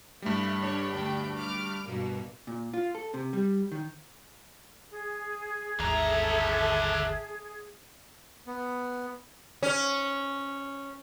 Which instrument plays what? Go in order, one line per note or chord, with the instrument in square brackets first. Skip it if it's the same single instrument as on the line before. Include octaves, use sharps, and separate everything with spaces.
[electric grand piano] G2 G3 [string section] A3 E4
[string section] D3 D4 C#5
D2 D4 G5
D6 F6
G2 B2 A#3
[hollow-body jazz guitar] A#2
F4
A4
C3
G3
D#3
[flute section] G#4
[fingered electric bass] G#1 D#2 [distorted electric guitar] D3 A#5 [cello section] A4 E5
[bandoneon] B3
[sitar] C#4